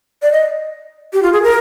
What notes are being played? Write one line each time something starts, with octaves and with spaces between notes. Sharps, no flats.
D5
D#5
G4
F4
G#4
A#4